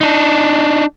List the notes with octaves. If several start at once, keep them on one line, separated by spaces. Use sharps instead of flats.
D4 D#4